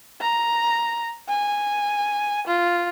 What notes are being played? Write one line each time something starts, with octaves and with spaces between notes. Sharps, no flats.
A#5
G#5
F4